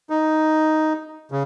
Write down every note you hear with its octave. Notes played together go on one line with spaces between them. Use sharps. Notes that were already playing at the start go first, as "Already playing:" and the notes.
D#4
C#3